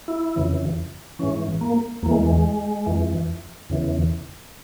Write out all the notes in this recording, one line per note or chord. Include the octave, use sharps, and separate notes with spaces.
E4
F2 C#3 E3
G#2 E3 C#4
A#3
E2 E3 A#3
G#3
G#3
F2 E3
E2 C#3 E3